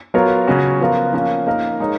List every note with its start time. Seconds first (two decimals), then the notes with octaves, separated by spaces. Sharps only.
0.14 F#3 B3 F4 A#4 C#5
0.47 C#3 F#3 C#4 F#4
0.80 F3 B3 F4 A#4
1.13 F3 A#3 C#4
1.47 A#3 D#4 A#4
1.80 G#3 D#4 A#4 C#5